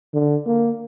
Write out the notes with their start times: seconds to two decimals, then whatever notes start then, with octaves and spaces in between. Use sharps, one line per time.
0.14 D3
0.46 A#3